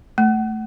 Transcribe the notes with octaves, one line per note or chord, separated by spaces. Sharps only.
A3